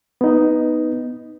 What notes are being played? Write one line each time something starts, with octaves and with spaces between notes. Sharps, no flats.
B3 D#4